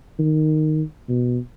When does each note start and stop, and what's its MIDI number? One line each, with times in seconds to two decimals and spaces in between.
0.19 0.83 51
1.09 1.38 47